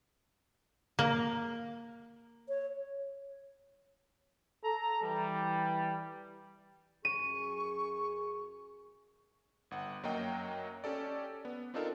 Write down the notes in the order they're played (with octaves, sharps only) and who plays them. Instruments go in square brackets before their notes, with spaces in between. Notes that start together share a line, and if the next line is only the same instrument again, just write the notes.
[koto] A#3
[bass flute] C#5
[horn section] A4 A#5
E3 G3
[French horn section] F#2 G#4 [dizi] C#6 [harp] D#7
[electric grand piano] G1 F#5
F#2 F#3 A#3 F#4 D#5 G5
C#4 G4 A4 D5
B3
C4 D4 D#4 F4 A4 A#4